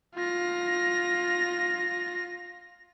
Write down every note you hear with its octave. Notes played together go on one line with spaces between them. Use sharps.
F4 A#6